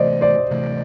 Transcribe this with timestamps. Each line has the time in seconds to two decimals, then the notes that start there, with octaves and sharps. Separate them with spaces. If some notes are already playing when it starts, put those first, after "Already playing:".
Already playing: C3 E3 A3 C5 D5 D#5
0.21 C5 D5
0.51 C3 E3 A3